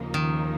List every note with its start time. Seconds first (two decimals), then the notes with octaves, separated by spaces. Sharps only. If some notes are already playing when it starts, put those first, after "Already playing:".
Already playing: D#2 C#3 F3 A#3 D#4
0.14 D#3